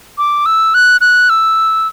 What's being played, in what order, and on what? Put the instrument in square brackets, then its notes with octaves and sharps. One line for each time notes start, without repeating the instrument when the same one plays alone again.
[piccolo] D6
E6
F#6
F#6
E6